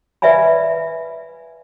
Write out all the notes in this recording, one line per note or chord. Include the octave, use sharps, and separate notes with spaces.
B4 D5 E5 F5 G#5 B5